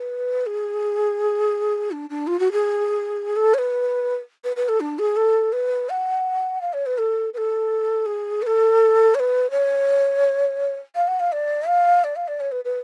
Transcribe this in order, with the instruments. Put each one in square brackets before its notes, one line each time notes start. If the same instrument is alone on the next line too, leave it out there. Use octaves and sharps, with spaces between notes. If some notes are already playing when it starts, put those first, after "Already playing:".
Already playing: [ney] B4
G#4
D4
D4
F4
F#4
G#4
A4
C#5
B4
B4
B4
A4
D4
G#4
A4
B4
F#5
F5
C#5
B4
A4
B4
A4
G#4
B4
A4
C#5
B4
C#5
F5
F#5
F5
D5
F5
D5
F5
D5
C#5
B4
B4